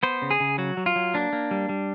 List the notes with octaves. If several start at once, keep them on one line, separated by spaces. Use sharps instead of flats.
B3 C5
C#3
G#4
C#3
F#3 F#4
F#3
F4
F#3
A#3 D4
A#3
G3
G3